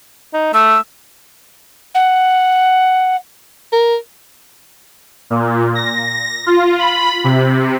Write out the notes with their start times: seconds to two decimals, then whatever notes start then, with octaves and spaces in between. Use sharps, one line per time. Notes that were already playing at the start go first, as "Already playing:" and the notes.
0.33 D#4
0.54 A3 E6
1.95 F#5
3.72 A#4
5.30 A#2
5.75 A#6
6.46 F4
6.79 B5
7.24 C3